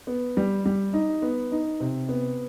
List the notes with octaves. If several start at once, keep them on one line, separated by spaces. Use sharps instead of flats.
B3
G3
G3
D#4
B3
D#4
C3
B3